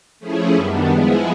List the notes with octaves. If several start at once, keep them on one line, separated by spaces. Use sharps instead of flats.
F3 A3 C#4 E4 G#4
F#2 D#3 G3 B3 D4
F3 G#3 B3 E4 G#4